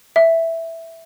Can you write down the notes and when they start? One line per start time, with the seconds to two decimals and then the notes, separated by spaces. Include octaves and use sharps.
0.16 E5